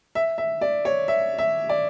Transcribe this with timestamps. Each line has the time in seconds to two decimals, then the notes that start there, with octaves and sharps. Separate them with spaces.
0.15 E5
0.38 E5
0.61 D5
0.85 C#5
1.08 E5
1.38 E5
1.69 D5